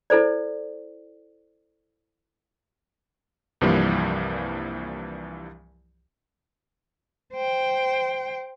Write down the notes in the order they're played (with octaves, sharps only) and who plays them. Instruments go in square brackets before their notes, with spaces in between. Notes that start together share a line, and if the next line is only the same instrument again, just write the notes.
[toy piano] E4 A4 C5 D5
[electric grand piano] C2 G2 E3 F3 G3 A#3
[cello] C5 G5